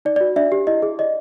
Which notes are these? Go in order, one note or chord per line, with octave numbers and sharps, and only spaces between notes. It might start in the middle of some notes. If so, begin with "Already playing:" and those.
D#4 D5
D5
F#4
D4 D5 E5
G4
E4 D#5
G#4
D5 D#5